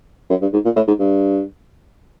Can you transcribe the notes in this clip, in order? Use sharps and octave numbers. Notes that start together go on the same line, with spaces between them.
F#2
G2
G#2
A#2
A2
G#2
G2